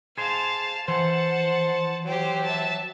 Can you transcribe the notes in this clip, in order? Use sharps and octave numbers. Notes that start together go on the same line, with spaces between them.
G#4 C5 F5 A5
E3 C5 F#5 A5
F#3 G4 C5
E5 A5